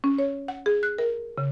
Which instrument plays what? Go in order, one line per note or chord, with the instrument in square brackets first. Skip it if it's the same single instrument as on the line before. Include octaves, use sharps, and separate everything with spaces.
[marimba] C#4
C#5
F#5
G#4
F#6
A#4
C#3